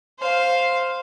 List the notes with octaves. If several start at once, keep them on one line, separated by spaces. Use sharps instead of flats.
C5 F5